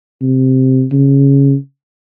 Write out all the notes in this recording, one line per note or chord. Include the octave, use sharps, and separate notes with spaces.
C3
C#3